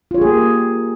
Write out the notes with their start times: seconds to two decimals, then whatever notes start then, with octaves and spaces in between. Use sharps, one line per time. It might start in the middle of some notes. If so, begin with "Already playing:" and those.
0.11 F4
0.14 C#5
0.18 G4
0.21 G#4
0.25 A#3